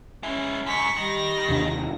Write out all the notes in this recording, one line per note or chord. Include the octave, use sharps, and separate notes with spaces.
G#3 C#4 E4
G#2 D3 C#6 B6
D#3 G3 A#6
D#2 C3 D4